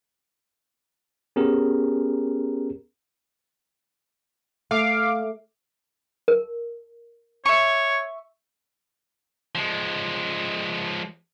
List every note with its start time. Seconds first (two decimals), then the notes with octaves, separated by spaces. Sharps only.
1.36 B3 C#4 G4 G#4 A#4
4.71 A3 F5 D6
6.28 A#4
7.46 C#5 E5 C#6
9.55 F3 G#3